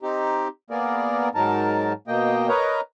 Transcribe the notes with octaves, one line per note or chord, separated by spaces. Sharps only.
C4 D#4 G4
A#3 B3 G#4 A#4 D5
G#2 F#3 D#4 A#4 A5
B2 A#3 D#5 G5
A#4 B4 C#5 D#5 A#5